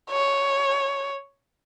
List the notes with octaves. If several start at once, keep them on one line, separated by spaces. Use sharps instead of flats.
C#5